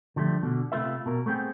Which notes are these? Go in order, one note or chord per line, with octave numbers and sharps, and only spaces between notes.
D3 F3 G3 A3
B2 D3
C3 A3 F4 B4 E5
B2 A#4
A3 B3 C4 G#4 G5